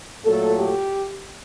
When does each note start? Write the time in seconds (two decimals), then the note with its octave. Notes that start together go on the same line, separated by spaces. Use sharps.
0.25 A#2 F#3 A3 A4
0.59 G4